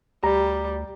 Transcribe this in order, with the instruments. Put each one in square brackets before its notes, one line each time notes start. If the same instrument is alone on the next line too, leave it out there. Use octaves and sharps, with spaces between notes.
[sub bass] D2 [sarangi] G3 [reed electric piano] G4 A#5